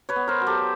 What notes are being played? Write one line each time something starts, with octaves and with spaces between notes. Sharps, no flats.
B4 C#5
B3
A#4 C5
F#3
G4 A4